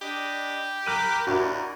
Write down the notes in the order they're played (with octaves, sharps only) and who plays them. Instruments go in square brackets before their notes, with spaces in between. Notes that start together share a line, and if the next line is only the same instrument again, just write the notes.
[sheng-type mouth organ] D4 D#5 B5 [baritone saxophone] G4
[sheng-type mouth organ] A#4 B5 D6 [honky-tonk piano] F#6 D#7
[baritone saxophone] D#2 [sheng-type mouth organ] D4 E4 [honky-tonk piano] F#4 A#4